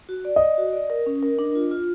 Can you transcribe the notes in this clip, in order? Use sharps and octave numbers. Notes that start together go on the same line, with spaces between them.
F#4
D5
D5 D#5
F#4
D5
A#4
C#4
A#4
D4
F4
F4